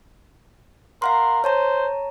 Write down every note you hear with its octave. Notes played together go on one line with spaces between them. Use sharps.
A#4 F5 F#5 C6
C5 C#5 A5 A#5